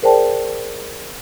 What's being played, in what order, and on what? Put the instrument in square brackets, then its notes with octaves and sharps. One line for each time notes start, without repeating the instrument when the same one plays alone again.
[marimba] G#4 A#4 C5 D5 G5 A5